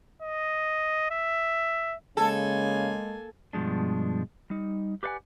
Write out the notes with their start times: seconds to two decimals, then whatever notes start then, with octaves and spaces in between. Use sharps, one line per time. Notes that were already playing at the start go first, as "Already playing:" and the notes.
0.22 D#5
1.11 E5
2.17 C#3 G#3 A#3 A4 G#5
3.53 G2 B2 F3 G#3 D4
4.50 G3 D#4
5.03 G4 B4 D5 F5 F#5 G#5